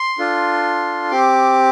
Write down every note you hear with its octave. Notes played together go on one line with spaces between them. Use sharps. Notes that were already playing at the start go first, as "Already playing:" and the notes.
Already playing: C6
D4 F4 A4
C4 G4 D6